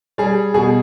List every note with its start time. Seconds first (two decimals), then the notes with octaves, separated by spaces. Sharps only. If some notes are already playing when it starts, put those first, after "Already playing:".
0.18 G3 G#4
0.54 B2 G#4